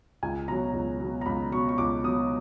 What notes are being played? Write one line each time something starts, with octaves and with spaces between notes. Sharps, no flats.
C#2 G#5
B2 F#3 A#5
C#2
B2 F#3
A#5
C#2 B5
B2 F#3 C#6
C#6
C#2 D6
B2 F#3 D#6